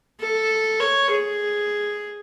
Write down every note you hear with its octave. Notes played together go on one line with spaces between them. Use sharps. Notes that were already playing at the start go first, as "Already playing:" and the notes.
A4
C#5
G#4